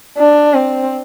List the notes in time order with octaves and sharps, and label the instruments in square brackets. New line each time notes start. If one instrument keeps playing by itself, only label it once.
[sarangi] D4
C4